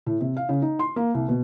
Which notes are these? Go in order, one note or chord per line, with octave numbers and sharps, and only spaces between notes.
A2
C3
F5
C#3
D#4
C6
A#3
C2
B2